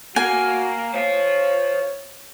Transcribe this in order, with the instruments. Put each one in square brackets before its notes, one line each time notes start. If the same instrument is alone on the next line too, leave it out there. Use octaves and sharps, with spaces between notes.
[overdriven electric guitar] A#3 [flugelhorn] F#4 [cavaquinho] G#5
[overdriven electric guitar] C5 F5 [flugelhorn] C#5